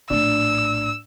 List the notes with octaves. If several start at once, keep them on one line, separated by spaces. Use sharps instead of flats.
A#1 A2 D4 E6